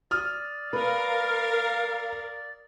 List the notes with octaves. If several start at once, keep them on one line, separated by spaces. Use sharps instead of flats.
D5 D#6 F6
A#4 B4 F5